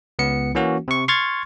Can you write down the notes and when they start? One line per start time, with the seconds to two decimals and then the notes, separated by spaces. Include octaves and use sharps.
0.19 C#2 B3 C#7
0.55 E3 A#3 C#4 F#4
0.88 C3 C#6
1.08 C6 C#6 F6 G#6 A6